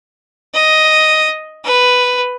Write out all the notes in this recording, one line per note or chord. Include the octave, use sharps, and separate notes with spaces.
D#5
B4